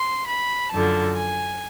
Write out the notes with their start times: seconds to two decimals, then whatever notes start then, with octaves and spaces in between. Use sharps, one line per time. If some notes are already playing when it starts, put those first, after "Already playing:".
Already playing: C6
0.26 B5
0.72 F#2 D3 F3 A5
1.16 G#5